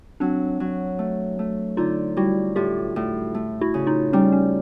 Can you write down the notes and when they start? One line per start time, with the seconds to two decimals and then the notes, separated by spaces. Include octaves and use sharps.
0.20 F#3 C4 D4
0.60 F#3
0.99 A3
1.39 A3
1.77 D3 D#4 F4
2.17 G3 E4 F#4
2.56 A2 F4 G4
2.96 A2
3.35 A3
3.61 E4 F#4
3.74 C#3
3.87 D#4 F4
4.13 G3 C#4 D#4
4.32 C#4